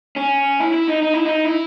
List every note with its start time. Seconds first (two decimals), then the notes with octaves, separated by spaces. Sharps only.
0.16 C#4
0.60 E4
0.73 E4
0.88 D#4
1.02 D#4
1.14 E4
1.26 D#4
1.45 E4